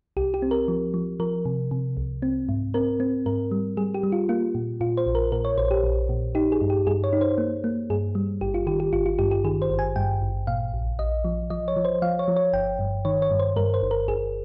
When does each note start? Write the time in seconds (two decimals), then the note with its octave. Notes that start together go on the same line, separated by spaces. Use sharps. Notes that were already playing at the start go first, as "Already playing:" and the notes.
0.17 C2 G4
0.34 G4
0.42 C4
0.51 A#4
0.68 F3
0.94 F3
1.20 F3 A#4
1.45 C3
1.71 C3
1.97 C2
2.22 C4
2.49 G#2
2.74 C4 A#4
3.00 C4
3.26 G#2 A#4
3.51 G3
3.77 G3 G#4
3.94 G4
4.03 G3
4.12 F4
4.29 A#3 F4
4.55 A#2
4.81 A#2 F4
4.97 C5
5.06 A#1
5.15 A#4
5.32 A#2 A#4
5.45 C#5
5.58 A#1 C5
5.71 G4
5.84 A#1
6.09 A#2
6.35 D#4 G4
6.52 G#4
6.61 G2
6.70 G4
6.87 G2 G#4
7.04 C#5
7.13 D#4
7.21 C5
7.38 A#3
7.64 A#3
7.90 G2 G#4
8.15 G3
8.41 G#1 G4
8.54 F4
8.67 D#3 G4
8.80 G4
8.93 G#1 F4
9.06 F4
9.19 G2 G4
9.31 G4
9.44 D#3 G#4
9.62 C5
9.70 G#1
9.79 G#5
9.96 G2 G5
10.22 G#1
10.47 A#2 F5
10.73 A#1
10.99 A#1 D#5
11.25 F3
11.50 F3 D#5
11.68 C#5
11.76 F3
11.85 C5
12.02 F3 F5
12.19 C#5
12.28 F3
12.36 C#5
12.53 G1 G5
12.79 G2
13.05 D#3 C#5
13.22 C#5
13.31 G2
13.39 C5
13.56 G2 A#4
13.74 C5
13.82 G1
13.91 A#4
14.08 G1 G#4